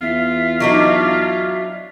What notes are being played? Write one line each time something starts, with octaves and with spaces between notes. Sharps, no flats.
E2 F4 E5
F#3 D4 D#4